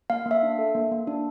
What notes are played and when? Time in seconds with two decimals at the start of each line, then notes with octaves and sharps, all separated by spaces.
0.10 A#3 F5
0.26 A#3
0.31 E5
0.43 D4
0.59 A4
0.75 A#3
0.92 A#3
1.07 D4